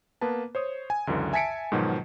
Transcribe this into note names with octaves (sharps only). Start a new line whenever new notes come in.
A#3 B3 B4 A5
C5 C#5 D#6
G#5
C#2 F#2 D3 E3
E5 G#5 A5 B6 C#7 D7
G#2 B2 D#3 F3 F#3